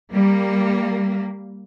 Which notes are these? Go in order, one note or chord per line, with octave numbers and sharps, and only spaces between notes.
G3 A#3